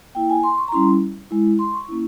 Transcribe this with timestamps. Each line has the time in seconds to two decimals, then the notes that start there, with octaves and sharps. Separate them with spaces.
0.15 A#3 E4 G5
0.30 G#5
0.43 C6
0.58 C#6
0.68 A#5
0.72 G3 C#4 E4 C6
1.31 G#3 E4
1.59 C6
1.74 C#6
1.88 A#3 C#4 E4